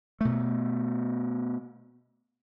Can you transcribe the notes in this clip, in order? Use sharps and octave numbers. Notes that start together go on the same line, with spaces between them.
B2 A3